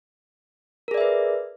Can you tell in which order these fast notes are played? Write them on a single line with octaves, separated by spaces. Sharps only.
A#4 G#4 D5 E5 B4